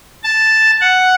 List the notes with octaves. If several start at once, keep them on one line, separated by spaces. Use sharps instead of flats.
A5
F#5